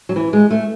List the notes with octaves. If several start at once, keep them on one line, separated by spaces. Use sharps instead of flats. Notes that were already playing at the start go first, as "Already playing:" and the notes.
F#3
E3
G#3
A3